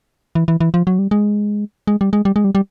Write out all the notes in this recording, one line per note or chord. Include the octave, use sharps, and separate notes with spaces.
E3
E3
E3
F3
F#3
G3
G#3
G#3
G3
G#3
G3
G#3
G3
G3